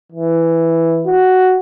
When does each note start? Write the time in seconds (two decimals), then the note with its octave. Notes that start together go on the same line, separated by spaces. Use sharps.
0.13 E3
1.06 F#4